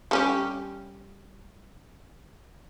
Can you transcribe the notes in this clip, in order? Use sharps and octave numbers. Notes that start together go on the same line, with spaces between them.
G3 C#4 G4